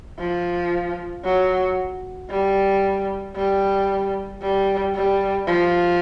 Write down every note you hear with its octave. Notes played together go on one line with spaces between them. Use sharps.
F3
F#3
G3
G3
G3
G3
F3